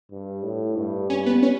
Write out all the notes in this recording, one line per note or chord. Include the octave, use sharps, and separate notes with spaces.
G2
A2
G2
G2 C#4
B3
C#4